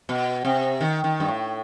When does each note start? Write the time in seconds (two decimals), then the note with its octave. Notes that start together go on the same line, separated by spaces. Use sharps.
0.09 B2
0.45 C3
0.81 D#3
1.04 D#3
1.20 G2
1.28 A2